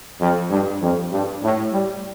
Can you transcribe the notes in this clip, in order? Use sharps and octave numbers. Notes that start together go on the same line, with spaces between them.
F2
G2
F2
G2
A2
G3